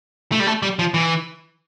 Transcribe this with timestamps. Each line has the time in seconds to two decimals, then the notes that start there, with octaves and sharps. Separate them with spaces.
0.32 A3
0.40 G3
0.47 A3
0.63 G3
0.79 F3
0.94 E3